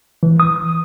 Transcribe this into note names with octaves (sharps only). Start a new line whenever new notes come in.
E3
D#6